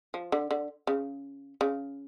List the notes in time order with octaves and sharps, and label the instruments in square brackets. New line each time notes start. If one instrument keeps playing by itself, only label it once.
[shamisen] F3
D3
D3
C#3
C#3